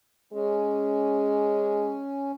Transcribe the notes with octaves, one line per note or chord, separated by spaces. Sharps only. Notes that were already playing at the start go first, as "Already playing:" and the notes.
G#3 C#4